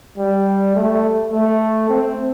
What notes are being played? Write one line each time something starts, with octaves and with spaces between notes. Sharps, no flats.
G3
A3
A3
C4